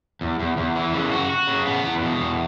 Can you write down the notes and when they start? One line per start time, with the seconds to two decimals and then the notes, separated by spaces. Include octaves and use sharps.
0.21 E2
0.39 E2
0.57 E2
0.76 E3
0.93 C#3
1.12 F#4
1.30 F#4
1.47 C#3
1.65 B3
1.84 E2
2.02 B2
2.20 E2